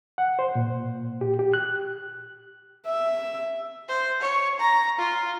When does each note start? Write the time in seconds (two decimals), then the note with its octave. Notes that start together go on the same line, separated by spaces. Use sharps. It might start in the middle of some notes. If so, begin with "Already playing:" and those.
0.18 F#5
0.39 C5
0.55 A#2
1.21 G4
1.39 G4
1.54 F#6
2.87 E5
3.88 C5
4.21 C#5
4.60 A#5
4.99 F4